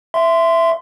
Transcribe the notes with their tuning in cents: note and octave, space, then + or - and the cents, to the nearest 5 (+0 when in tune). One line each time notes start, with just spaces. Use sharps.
E5 +10 C6 -15